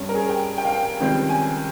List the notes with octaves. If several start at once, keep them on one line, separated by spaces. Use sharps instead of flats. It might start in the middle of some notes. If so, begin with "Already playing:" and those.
Already playing: G2 G3 C#4
A#4
G#4
G5
G5
F5
G5
C#2 C3 D#3 G3 C4
G#5